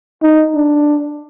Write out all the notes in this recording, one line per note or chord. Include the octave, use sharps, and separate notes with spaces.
D#4
D4